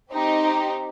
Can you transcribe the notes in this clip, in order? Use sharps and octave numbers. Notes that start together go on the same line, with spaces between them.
C4 D#4 G4